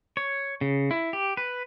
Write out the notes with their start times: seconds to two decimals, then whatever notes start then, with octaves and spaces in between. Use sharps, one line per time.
0.17 C#5
0.61 C#3
0.91 E4
1.13 G4
1.37 B4